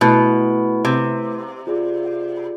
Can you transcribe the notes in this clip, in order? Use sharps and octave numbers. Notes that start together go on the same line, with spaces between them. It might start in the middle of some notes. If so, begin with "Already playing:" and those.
B2 A3 E4 B4
C3
F4 G#4 D5